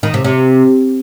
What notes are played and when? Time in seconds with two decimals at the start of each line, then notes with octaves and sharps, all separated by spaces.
0.03 D#3
0.14 C3
0.24 C3